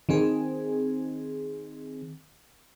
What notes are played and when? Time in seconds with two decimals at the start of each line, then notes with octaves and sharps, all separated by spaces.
0.09 D#3 C4 G#4